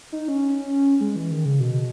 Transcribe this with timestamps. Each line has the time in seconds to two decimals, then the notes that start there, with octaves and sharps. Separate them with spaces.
0.12 D#4
0.28 C#4
1.01 G#3
1.16 E3
1.31 D#3
1.45 C#3
1.60 B2